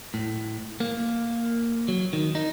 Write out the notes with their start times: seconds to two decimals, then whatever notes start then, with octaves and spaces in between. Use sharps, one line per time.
0.14 A2
0.80 A#3
1.88 F#3
2.13 D#3
2.35 D#4